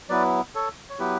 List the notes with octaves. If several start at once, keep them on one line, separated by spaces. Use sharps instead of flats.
F#3 B3 E4 B4 D5
A4 C#5
C#5
F#3 B3 E4 G4 B4